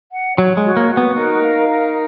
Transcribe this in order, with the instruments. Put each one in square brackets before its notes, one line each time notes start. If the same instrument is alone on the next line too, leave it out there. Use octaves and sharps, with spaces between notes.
[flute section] F#5
[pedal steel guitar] F#3 [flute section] C#5
[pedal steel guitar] G#3
[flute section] F#4
[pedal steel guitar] A#3
[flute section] F#4
[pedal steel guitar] B3
[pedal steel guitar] D#4 [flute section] A#4
[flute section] F5
A#4